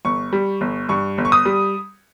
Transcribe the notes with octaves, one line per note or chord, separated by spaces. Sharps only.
G1 C#6
G3
G1
G2 C#6
G1
C#6
D#6
G3